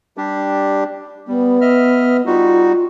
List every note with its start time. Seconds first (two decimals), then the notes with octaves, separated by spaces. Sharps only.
0.17 G3 D4 G4
1.28 G3 B3
1.61 D#5 E5 F6
2.26 G3 D#4 F4 F#4